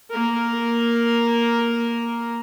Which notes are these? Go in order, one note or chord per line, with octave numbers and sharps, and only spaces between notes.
A#3 A#4